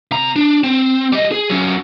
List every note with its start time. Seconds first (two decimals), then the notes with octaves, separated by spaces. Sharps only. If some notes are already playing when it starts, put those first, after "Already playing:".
0.11 C3 A#5
0.36 D4
0.64 C4
1.12 G3 D#5
1.32 G#4
1.50 F#3 C#4